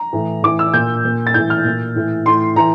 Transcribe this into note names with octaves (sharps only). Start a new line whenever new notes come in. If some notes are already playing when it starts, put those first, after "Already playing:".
Already playing: A#5
A2 E3
A2 E3 D6
E6
A#2 G6
A#2
A6
A2 E3 G6
F6
A#2
A2 E3
A2 E3 C6
A2 E3 A#5